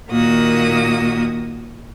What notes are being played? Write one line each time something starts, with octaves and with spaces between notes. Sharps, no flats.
A#2 D#3 A#3 F#4 D#6